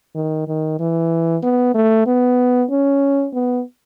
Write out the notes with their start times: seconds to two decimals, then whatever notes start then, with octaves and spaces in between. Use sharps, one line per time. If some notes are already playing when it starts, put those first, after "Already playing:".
0.15 D#3
0.48 D#3
0.79 E3
1.43 B3
1.75 A3
2.06 B3
2.70 C#4
3.34 B3